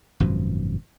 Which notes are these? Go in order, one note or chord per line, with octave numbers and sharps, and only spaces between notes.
G#1 F#2 B2 F3